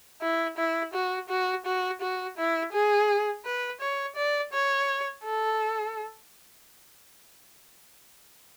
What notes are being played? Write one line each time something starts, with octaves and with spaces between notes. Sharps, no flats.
E4
E4
F#4
F#4
F#4
F#4
E4
G#4
B4
C#5
D5
C#5
A4